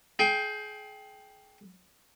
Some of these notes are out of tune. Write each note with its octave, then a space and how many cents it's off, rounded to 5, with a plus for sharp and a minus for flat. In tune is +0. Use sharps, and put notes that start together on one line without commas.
G#4 +30 G5 +0